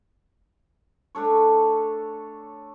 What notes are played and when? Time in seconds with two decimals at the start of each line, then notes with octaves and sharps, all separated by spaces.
1.15 A3 D4 A4 C#5